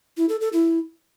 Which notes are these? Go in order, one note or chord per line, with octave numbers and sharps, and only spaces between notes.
E4
A4
A4
E4